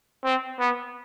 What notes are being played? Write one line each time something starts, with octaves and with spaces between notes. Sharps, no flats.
C4
B3